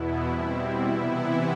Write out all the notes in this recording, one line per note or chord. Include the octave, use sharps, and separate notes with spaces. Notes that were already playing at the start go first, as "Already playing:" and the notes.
Already playing: E2 B2 B3 E4
B2 G3 C4
C3 E3 B3 E4
E4